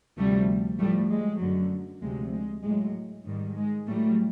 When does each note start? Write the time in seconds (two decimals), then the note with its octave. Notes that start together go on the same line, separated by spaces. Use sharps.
0.17 D2 C3 F3 G3 A3
0.78 A2 F3 G3 A3
1.10 G#3
1.40 F#2 D3 F#3
2.01 D2 C3 F3 G#3
2.33 G#3
2.63 A2 F#3 G#3
3.25 G#2 D#3 G3
3.56 G#3
3.87 A2 F#3 G3 A3